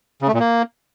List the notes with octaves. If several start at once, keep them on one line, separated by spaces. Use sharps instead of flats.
C#3
A3
A#2
A#3